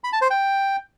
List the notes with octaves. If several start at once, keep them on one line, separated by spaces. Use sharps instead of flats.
B5
A5
C5
G5